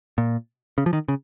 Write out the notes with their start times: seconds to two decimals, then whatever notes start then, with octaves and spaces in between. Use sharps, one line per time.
0.18 A#2
0.78 C#3
0.86 F3
0.93 D#3
1.08 C#3